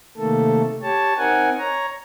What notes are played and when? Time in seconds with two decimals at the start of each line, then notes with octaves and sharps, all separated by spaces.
0.18 C3 D#3 A3 A#3 A4
0.82 G4 C#5 A5
1.18 C4 D#4 A#4 F#5 G#5
1.59 C#5 A#5